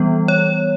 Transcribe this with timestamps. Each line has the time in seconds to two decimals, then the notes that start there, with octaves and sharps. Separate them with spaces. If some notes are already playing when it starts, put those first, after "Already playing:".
Already playing: E3 G3 B3
0.28 C#5